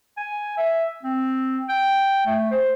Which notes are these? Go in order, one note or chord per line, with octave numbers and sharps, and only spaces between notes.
G#5
E5
C4
G5
A3
C5